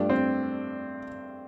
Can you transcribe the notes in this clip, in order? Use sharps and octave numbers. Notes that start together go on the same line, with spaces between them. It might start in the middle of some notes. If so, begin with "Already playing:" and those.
Already playing: G2 F3 A3 D4
C4